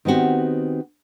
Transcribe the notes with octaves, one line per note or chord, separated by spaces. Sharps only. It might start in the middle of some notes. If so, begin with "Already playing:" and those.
D#3 B3 C4 F#4 G4